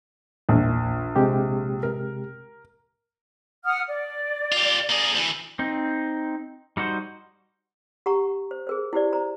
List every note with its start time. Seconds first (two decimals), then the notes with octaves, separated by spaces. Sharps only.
0.49 A#1 E2 A#2
1.16 C3 G#3 G4
1.83 A#4
3.64 F#5 D#6 F6
3.88 D5
4.52 F4 G4
4.90 A#3 G#4
5.15 D2 E3
5.59 C4 D#4
6.77 G3 D#4 F#4 C5
8.06 G4 F#5 A#5 C#6
8.51 C5
8.67 G#4 A#4 C5
8.93 E4 G4 C5 D5
9.13 C5 A#5